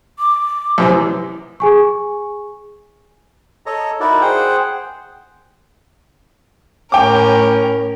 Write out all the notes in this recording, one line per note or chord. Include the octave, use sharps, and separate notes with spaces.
D6
F#2 C3 E3
G#4 G#5 C#6
A4 C#5 D#5 A#5
D#4 E4 F#4 A#4 D5
G#4 C5 F#5 G5
A2 C#4 A#4 G5 D6